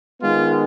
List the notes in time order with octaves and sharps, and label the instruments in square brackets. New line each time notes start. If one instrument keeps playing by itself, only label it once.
[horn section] D#3 G#3 B3 F4